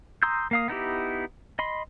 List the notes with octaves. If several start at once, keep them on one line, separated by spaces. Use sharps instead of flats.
A#5 C6 D#6 E6 G6
A#3 F5 D#6
B3 D#4 E4 G4
D#5 B5 C6